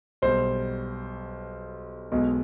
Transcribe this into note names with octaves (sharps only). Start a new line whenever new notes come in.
B1 B2 G3 C5
B1 B2 G#3